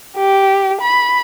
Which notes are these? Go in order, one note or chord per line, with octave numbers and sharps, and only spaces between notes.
G4
B5